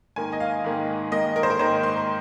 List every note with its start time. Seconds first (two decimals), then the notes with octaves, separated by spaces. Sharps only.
0.16 G#2 D#3 A#3 G#5
0.33 D#5
0.40 F5
0.64 G#2 D#3 A#3
1.12 G#2 D#3 A#3 D#5
1.36 A#4
1.43 C5
1.50 A#4
1.59 G#2 D#3 A#3 C5
1.83 C6